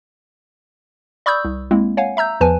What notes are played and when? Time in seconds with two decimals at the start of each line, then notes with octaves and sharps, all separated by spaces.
1.26 D5 B5 C#6 D#6 E6 G6
1.45 C2
1.71 G#3 A#3 C4 E4
1.97 C#5 F5 F#5 G#5
2.17 E5 A#5 E6 G6
2.41 E2 F3 B4 G#5 A5